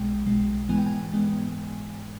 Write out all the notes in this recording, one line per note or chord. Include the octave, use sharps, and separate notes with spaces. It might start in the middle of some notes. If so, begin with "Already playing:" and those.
Already playing: B1 B2 G#3 G5
B1 B2 G#3
G#2 E3 G#3 B3 G#5
G5
G#5
G#2 E3 G#3 B3